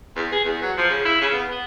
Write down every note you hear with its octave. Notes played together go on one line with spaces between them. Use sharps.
E2
G#4
E2
F#3
F3
C#3
E4
C#3
B3
B3